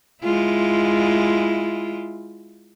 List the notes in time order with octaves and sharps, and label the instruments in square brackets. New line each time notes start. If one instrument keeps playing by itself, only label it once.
[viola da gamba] G#3 E4 F4